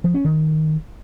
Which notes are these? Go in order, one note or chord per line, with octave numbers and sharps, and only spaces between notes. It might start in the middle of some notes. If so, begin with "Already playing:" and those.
F3
C#4
D#3